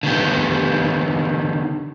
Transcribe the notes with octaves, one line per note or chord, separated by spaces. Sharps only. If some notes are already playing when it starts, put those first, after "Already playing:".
D3 D#3 B3 G4